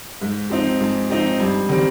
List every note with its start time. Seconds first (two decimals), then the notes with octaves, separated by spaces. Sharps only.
0.22 G#2
0.50 F3 C4 D#4
0.81 G#2
1.10 F3 C4 D#4
1.40 G2
1.69 D#3 G3 C4